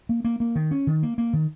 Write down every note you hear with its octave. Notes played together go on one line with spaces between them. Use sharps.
A#3
A#3
A#3
D#3
C#4
D#3
A#3
A#3
D#3